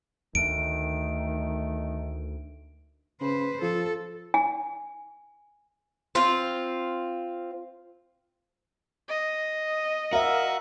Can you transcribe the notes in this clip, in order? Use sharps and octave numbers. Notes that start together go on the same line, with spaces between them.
D2 D#3 A3 D7
C#3 B4 C5
F3 A4
G#5
C4 F4
D#5
F#4 A#4 E5 F5